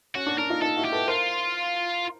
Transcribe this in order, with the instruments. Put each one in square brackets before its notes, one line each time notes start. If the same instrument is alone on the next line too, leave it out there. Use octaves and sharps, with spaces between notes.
[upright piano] C#4 [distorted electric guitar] F#4
[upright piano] D4
[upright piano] D4 [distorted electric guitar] A#4
[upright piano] D#4 F4
[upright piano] D#4 F4 [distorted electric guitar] A4
[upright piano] E4 F#4
[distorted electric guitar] G4
[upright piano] A4 B4
[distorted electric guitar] F4 [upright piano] A#4 C5